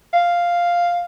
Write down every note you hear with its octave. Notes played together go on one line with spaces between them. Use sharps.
F5